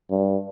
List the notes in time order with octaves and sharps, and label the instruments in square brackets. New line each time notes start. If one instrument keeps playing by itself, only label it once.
[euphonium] G2